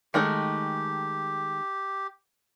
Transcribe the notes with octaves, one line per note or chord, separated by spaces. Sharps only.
D#3 G#3 A3 G4